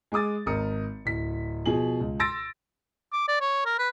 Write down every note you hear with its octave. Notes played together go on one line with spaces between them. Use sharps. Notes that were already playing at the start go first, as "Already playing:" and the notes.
G#3 G#4 D6 D#6 A6
G#1 A#4 D#6 C#7
D1 B6
B2 F3 G#4 F#7
C#2
C6 E6 A6 A#6 D7
D6
D5
C#5
A#4
B4